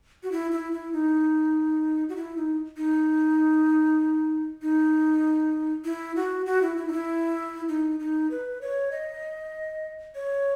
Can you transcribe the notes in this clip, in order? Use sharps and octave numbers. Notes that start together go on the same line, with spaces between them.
F#4
E4
E4
E4
D#4
F#4
E4
D#4
D#4
D#4
E4
F#4
F#4
E4
E4
D#4
E4
D#4
D#4
B4
C#5
D#5
C#5